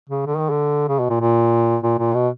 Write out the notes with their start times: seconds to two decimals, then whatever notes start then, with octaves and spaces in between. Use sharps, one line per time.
0.09 C#3
0.26 D3
0.38 D#3
0.50 D3
0.88 C#3
0.99 B2
1.10 A#2
1.21 A#2
1.83 A#2
1.99 A#2
2.14 B2